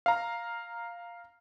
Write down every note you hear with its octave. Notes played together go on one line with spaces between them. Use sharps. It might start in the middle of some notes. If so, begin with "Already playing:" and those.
F5 A#5